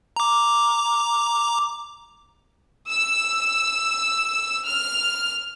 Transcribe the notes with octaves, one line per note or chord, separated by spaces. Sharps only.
A#5 D6
E6
F6